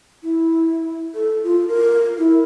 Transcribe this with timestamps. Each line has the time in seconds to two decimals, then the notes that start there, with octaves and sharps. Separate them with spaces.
0.23 E4
1.15 A4
1.44 F4
1.68 A#4
2.18 E4